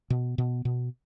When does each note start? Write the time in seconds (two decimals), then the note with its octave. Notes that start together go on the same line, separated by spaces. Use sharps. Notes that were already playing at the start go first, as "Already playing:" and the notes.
0.10 B2
0.38 B2
0.65 B2